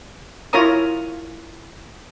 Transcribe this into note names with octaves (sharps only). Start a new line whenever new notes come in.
E4 F4 A#4 C#5 A#5 D#6